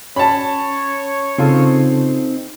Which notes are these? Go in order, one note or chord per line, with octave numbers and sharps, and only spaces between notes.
C#4 C#5 A5 B5
C#3 C4 D#4 F4 A4 C5